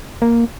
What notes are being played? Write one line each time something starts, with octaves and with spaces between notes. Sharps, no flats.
A#3